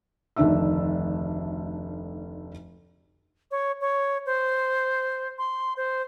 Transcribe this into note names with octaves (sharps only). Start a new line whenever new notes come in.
F1 D2 D#3 D4 E5 E6
C#5
C#5
C5
C6
C5